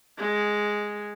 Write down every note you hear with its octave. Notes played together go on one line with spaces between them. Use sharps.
G#3